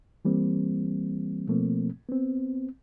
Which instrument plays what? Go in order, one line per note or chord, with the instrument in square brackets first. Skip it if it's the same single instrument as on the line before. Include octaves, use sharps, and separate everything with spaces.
[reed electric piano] E3 G3 A#3 C4
B2 F3 A3 A#3 C4
B3 C4